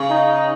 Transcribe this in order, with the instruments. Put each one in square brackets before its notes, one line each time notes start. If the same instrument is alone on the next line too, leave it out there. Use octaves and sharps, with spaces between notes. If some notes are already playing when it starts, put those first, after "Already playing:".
Already playing: [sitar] C#3
[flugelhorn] D#4